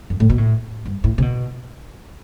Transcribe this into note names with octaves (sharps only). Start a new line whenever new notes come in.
F#2
A2
B2
A2
G2
A2
C3
B2